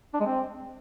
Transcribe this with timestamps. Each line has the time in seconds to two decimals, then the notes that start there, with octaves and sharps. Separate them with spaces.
0.14 D4
0.20 G#3
0.26 C4